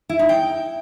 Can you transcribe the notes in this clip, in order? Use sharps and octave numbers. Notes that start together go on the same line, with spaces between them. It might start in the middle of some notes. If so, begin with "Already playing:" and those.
E4
D#4
G5